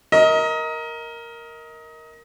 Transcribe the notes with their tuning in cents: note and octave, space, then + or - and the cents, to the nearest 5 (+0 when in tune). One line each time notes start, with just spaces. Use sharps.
A#4 +0 D#5 +25